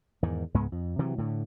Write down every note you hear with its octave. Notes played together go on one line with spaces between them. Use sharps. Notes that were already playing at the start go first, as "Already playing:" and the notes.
E2 G#2 D#3
C#2 G#2 G#3 B3
F2
C3 E3 F#3
A2 D3